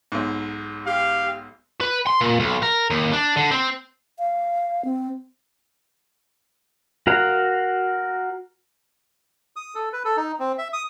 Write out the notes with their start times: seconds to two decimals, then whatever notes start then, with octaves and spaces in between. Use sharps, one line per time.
0.12 B1 G#2
0.86 G4 F5
1.81 B4
2.07 C6
2.21 A#2
2.40 B1
2.63 A#4
2.90 D#2
3.13 D4
3.37 D3
3.51 C4
4.19 F5
4.85 C4
7.07 F#4 A#4 F5 F#5
9.56 D#6
9.75 A4
9.93 B4
10.05 A4
10.17 D#4
10.39 C4
10.58 E5
10.73 D#6